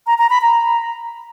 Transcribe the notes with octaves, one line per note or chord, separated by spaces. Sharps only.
A#5
A#5
B5
A#5